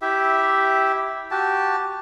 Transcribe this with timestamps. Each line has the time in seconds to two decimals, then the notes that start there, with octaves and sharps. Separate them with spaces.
0.02 E4 G4 E5
1.31 F#4 G4 A5